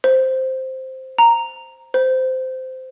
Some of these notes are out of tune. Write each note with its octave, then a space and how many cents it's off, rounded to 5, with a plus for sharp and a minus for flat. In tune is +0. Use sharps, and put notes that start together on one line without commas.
C5 +0
A#5 -5
C5 -15